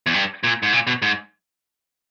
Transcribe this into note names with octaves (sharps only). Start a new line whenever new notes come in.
E2
G2
A#2
G#2
A#2
B2
G#2